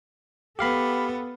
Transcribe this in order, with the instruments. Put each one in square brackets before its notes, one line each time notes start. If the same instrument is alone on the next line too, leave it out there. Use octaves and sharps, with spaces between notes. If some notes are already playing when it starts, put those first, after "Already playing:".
[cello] B3 A4 [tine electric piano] G4 F5 B5